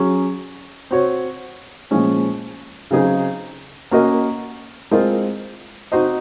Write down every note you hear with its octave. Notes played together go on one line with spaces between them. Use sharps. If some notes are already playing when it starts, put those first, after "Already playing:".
Already playing: F#3 C#4 G#4
C4 F#4 C#5
A#2 F3 G#3 C#4
C#3 F#3 C4 D#4 G#4
A#3 C#4 F#4 A#4 D#5
G#3 C4 F4 A#4 D#5
C4 D#4 F#4 C5 D#5